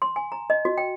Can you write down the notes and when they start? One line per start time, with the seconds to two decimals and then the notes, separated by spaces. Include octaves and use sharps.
0.02 C6
0.16 G#5
0.32 A#5
0.50 D#5
0.65 F#4
0.78 G5